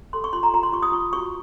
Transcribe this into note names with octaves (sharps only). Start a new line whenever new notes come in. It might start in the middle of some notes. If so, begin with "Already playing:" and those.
A4 C6
C#6
F4 C6
A#5
F4 A#5
C6
F4 C#6
D#6
F4 C#6
F#4 C#6